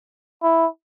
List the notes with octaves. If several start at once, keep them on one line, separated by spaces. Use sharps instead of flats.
E4